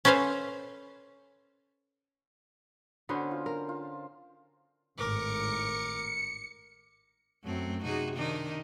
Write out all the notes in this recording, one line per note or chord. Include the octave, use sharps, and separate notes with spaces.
C#4 A4 B4 C5 F5
D3 B3 C#4 F#4 C5
F4
A#4
F4
G#1 A2 A#4 D6 C#7
F#2 F#3 A3 C4
C3 D#4 F#4 G#4
D#3 D4 D#4